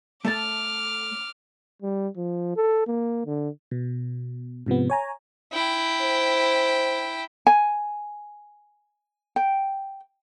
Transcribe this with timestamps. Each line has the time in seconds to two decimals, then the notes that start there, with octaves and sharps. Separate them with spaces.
0.25 A3 A4 A5 D6 F6
1.82 G3
2.17 F3
2.56 A4
2.87 A#3
3.26 D3
3.71 B2
4.66 G#2 C3 F3 B3
4.90 C#5 G#5 A#5
5.52 E4 G5
6.01 C5
7.47 G#5
9.36 G5